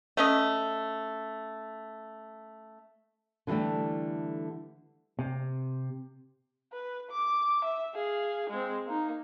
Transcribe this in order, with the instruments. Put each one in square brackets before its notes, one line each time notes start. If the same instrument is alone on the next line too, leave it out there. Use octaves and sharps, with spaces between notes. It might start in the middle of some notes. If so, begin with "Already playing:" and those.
[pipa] A3 C#4 D#5
[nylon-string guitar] D3 E3 F3 G3 A3
[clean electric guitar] C3
[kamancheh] B4
D6
E5
G#4 F5
G#3 C4
A#3 D#4